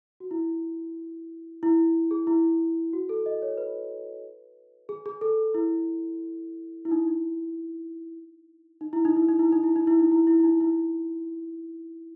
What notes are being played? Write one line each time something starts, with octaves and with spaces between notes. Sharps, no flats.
F#4
E4
E4
G#4
E4
F#4
A4
D#5
C#5
B4
G#4
G#4
A4
E4
E4
D#4
D#4
D#4
E4
D#4
E4
D#4
E4
D#4
E4
D#4
E4
D#4
E4
E4
E4
D#4
E4